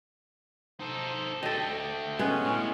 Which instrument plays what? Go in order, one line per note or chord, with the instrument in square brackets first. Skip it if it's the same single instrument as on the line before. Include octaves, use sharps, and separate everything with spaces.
[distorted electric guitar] D#4 A4 [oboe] C5
[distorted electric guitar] D3 A3 [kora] A4 D#5 [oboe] G5
[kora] G#3 B3 G#4 [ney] C#4 [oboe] G#5
[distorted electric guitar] A2